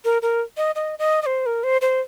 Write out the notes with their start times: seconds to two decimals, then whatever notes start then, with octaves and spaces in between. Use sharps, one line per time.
0.04 A#4
0.22 A#4
0.57 D#5
0.75 D#5
0.99 D#5
1.22 D#5
1.26 C5
1.46 A#4
1.63 C5
1.81 C5